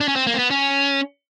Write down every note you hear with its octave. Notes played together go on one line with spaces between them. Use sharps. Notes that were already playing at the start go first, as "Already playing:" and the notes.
D4
C#4
C4
A#3
C4
B3
C#4